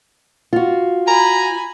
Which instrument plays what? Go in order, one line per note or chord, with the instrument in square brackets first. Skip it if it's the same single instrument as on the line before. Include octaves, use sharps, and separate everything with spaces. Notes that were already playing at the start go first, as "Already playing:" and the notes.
[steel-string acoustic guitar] F4 F#4
[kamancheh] G#5 B5 [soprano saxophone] A#5